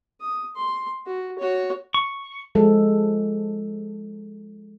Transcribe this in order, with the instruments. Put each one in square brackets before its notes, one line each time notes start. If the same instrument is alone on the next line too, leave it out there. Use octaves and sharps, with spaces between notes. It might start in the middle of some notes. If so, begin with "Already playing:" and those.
[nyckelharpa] D#6
C6
F#4
F#4 C#5
[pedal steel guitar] C#6
[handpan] F3 G#3 A4